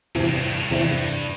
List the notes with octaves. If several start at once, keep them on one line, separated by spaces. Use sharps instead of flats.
E2 G2 C3 E3
A2
G2
A2
G2
A2
G2
E2 A2 C3 E3
G2